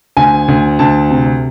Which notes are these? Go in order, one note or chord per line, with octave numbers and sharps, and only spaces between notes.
D2 G#5
D2
D2 A5
C3